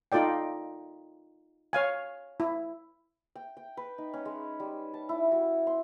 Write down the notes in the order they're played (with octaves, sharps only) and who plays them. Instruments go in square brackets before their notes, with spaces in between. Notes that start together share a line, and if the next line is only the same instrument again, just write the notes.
[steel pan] D#4 F4 A4 D5 G5
C#5 F5 G#5
E4
[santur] G5
G5
B4
D#4
C#4
G#3
G3
A5
E4
F#4
C6